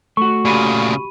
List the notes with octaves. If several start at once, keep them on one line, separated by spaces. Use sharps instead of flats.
A3 F#4 C#6
A#2 C#3 G4 B5 D#7